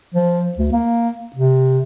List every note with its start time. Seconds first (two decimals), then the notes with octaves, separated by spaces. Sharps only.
0.15 F3
0.58 D2
0.73 A#3
1.36 C3